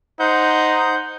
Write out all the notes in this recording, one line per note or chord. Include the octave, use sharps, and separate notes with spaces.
D#4 C5 F#5 G6